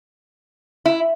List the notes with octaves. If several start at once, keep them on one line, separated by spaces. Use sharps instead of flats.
E4